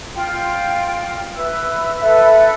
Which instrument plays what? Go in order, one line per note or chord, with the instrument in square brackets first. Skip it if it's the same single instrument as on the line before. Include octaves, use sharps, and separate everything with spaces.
[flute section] F4 G5
B4 E5 E6
[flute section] A4 B4 [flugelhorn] E5